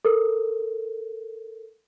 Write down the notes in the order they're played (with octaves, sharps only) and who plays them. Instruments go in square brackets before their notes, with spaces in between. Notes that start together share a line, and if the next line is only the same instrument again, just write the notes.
[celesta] A4 A#4